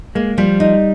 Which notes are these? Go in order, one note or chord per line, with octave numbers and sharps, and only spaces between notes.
G#3 A#3
F3 G3
D#4